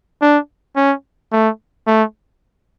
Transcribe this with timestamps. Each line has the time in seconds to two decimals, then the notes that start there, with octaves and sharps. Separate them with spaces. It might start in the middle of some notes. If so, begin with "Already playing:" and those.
0.22 D4
0.76 C#4
1.32 A3
1.87 A3